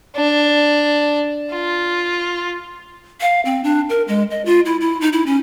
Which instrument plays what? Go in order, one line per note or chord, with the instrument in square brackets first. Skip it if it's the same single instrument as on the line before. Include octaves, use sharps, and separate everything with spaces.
[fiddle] D4
F4
[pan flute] F5
C4
D4
A#4
G#3
D#5
F4
E4
E4
D#4
E4
C#4